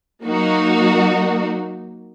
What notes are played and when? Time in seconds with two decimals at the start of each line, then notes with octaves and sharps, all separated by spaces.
0.24 F#3 A#3 D#4 F#4